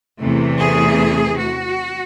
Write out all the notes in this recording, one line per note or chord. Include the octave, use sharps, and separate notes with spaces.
E2 C3 E3 A3
G#4
F#4